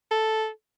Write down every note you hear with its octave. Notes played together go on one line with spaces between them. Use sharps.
A4